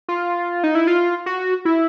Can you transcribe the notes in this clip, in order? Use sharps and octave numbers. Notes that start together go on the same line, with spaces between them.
F4
D#4
E4
F4
F#4
E4